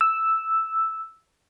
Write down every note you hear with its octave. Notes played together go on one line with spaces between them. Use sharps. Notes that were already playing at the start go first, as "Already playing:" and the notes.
E6